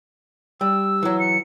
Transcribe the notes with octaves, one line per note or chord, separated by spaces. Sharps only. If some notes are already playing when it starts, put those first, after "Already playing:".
G3 E6
E3 F#3
C#7